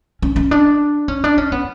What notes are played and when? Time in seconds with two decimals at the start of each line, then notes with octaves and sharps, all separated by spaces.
0.22 C#4
0.36 C#4
0.51 D4
1.08 C#4
1.24 D4
1.38 C#4
1.52 B3